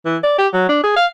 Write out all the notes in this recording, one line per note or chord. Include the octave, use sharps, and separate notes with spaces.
E3
D5
G4
F#3
D4
G#4
F5